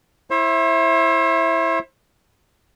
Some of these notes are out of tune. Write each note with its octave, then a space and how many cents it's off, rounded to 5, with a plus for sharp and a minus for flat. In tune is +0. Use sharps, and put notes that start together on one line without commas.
E4 +0 C5 +40 E5 +0